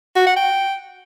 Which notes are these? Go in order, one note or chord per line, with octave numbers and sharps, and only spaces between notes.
F#4
F#5
G5